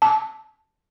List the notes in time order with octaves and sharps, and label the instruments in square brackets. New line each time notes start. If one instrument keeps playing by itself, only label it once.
[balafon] A5